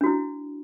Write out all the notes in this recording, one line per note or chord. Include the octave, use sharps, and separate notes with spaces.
D4 E4 F#4